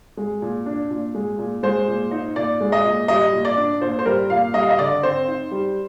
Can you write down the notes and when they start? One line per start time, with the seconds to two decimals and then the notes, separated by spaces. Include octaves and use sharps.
0.17 G#3
0.42 A#2
0.66 D4
0.90 A#2
1.15 G#3
1.38 A#2
1.63 G#3 C5
1.87 A#2
2.11 D#4
2.36 A#2 D5
2.61 G#3
2.72 D#5
2.84 A#2
3.08 G3 D#5
3.32 A#2
3.45 D5
3.57 D4
3.81 A#2 C5
3.99 C5
4.06 G3 A#4
4.30 A#2 F5
4.54 G3 D#5
4.63 F5
4.70 D#5
4.79 D3 D5
5.03 C4 C5
5.27 D#4
5.51 G3